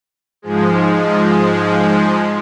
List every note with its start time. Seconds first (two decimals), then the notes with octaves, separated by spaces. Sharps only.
0.42 G#2 F3 G#3